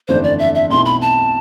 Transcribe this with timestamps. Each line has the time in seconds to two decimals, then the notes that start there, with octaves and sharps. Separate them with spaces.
0.08 G1 F2 E3 A3 D4 C5
0.24 D5
0.39 E5
0.55 E5
0.70 B1 B2 A3 C4 E4 C6
0.86 B5
1.02 A5